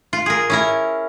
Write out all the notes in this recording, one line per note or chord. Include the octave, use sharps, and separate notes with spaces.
F4
G#4 A#4
C#4 E4 A#4